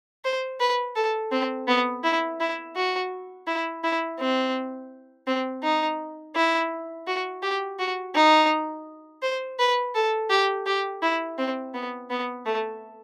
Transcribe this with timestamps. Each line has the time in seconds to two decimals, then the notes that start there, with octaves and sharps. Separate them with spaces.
0.25 C5
0.60 B4
0.96 A4
1.32 C4
1.68 B3
2.04 E4
2.40 E4
2.76 F#4
3.47 E4
3.84 E4
4.19 C4
5.27 C4
5.63 D#4
6.36 E4
7.07 F#4
7.42 G4
7.79 F#4
8.15 D#4
9.23 C5
9.59 B4
9.95 A4
10.30 G4
10.66 G4
11.03 E4
11.38 C4
11.74 B3
12.10 B3
12.46 A3